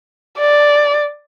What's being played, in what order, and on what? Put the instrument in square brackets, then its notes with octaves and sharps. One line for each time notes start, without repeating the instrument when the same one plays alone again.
[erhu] D5